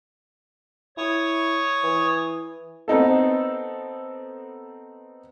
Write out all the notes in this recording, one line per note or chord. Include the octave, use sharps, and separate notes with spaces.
E4 C#5 C#6 D#6
E3
B3 C4 D#4 A4